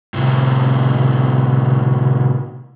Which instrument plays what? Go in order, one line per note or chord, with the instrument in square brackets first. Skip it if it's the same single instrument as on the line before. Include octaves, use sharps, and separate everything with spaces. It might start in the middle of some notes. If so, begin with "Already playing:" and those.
[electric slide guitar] A2 C3